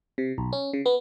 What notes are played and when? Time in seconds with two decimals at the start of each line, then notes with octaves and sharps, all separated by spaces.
0.18 C3
0.38 B1
0.53 C#4
0.73 C#3
0.86 B3